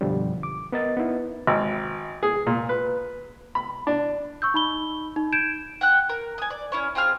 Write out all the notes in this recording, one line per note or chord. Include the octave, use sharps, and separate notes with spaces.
F#2 B2 D3 F3 G3
D6
B3 A#4 D#5 A6
B3 D#4 E4
G#1
G#4
A#2
B4
B5
D4
C#6 E6 G6
D#4 B5 G7
D#4
G6 G#6 D7 E7
F#5 G5 F#6
A#4
G#5 D#6
D5
C#4 E4 C#5
C4 F4 G#4 F6